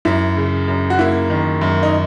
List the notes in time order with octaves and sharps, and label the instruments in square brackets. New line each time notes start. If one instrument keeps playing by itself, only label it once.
[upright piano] F#2 E4
C#3
F#2
F#4
A#3 E4
D#3
F#2
D#4